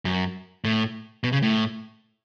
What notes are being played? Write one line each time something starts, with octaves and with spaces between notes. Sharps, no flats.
F#2
A2
B2
C#3
A2